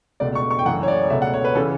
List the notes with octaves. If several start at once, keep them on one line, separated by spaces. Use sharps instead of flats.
C#2 B2 A3 D5
C#6
C#6
G5
F#1 F#2 E3 A3 F#5
C#5
D5
C#2 B2 A3 E5
F#5
C#5
B4
C#3 E3 A4